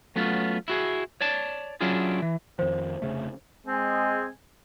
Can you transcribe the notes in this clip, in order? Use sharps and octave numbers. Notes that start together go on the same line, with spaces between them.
F#3 A3 B3 C#4 F4
E4 F#4 G#4
C#5 D5 A5
F#3 C#4 D4 E4 F4 G#4
E3
F2 D#3 F3 C5
F1 C#3 A3
G#3 C4 G#5